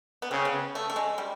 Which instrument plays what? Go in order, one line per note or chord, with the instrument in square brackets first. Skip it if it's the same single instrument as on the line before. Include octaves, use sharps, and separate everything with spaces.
[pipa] B3
[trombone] C#3 [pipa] C4
[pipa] B3
A3
A3
G#3
G3